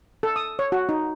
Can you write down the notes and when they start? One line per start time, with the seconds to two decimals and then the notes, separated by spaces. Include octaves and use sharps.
0.23 A4
0.36 D#6
0.59 C#5
0.72 F#4
0.89 D#4